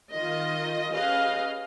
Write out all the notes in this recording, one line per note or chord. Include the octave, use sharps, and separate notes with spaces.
D#3 F4 D#5
C#4 G4 G#4 B4 D#5 F5